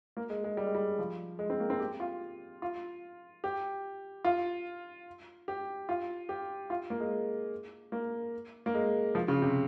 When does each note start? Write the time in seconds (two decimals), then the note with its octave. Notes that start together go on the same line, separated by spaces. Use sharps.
0.17 A#3
0.30 G#3
0.44 G#3
0.57 G3
0.67 G#3
0.75 G3
0.99 F3
1.39 G#3
1.50 C4
1.60 A#3
1.70 C4
1.80 G4
2.00 F4
2.62 F4
3.44 G4
4.25 F4
5.48 G4
5.89 F4
6.29 G4
6.70 F4
6.90 A#3
7.00 G#3
7.92 A#3
8.66 A#3
8.75 G#3
9.15 F3
9.28 C#3
9.42 C3